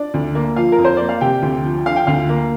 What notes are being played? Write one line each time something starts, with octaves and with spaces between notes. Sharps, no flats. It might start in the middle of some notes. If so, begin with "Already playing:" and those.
Already playing: D4 D5
D2
A#3
F3 F4 F5
A#4
F2
C5
A#3 D5
F5
C3 G4 G5
D2
F3
D3 F5
G5
D2 F4 F5
A#3